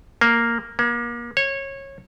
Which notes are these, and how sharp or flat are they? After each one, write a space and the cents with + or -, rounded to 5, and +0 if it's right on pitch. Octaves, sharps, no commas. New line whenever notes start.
A#3 -5
A#3 +35
C#5 -20